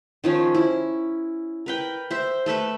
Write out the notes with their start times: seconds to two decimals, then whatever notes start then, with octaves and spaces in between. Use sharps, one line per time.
0.24 D#3 F3 C#4
0.55 E4
1.66 A#4 B4 G5
2.11 C5 E5
2.46 A3 A4 B4 E5